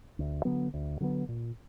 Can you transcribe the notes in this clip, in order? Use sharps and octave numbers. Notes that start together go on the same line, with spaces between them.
D2
D3 F#3 B3
D2
D3 F#3 B3
A#2